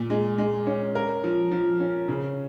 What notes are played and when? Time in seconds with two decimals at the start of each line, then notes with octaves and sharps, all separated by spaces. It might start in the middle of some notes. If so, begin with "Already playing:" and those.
Already playing: A#2
0.10 G#3
0.38 G#3
0.67 C#4
0.95 A#4
1.24 F3
1.51 F3
1.80 C#4
2.08 C#3